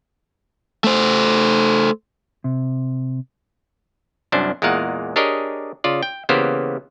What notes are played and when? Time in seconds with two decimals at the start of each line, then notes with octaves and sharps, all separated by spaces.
0.84 A3 C5
2.44 C3
4.32 C2 F#2 C#4 D4 C5
4.62 E2 A#2 G#3 A#4 F5 F#5
5.16 D4 G4 G#4 A#4 C#5 D#5
5.84 C#3 F4 D5
6.03 G5
6.29 C#3 E3 A#3 B3 G4 C5